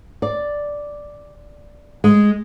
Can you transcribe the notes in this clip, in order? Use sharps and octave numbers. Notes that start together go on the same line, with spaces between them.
D5
G#3